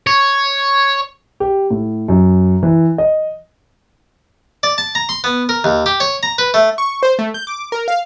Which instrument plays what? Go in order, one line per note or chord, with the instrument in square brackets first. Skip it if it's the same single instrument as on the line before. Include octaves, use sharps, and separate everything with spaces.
[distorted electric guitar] C#5
[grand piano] G4
A2
F#2
E3
D#5
[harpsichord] D5
A5
A#5
C6
B3
A#4
D#2
G4
C#5
A#5
B4
A3
[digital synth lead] C#6
C5
A3
G6
D6
A#4
F5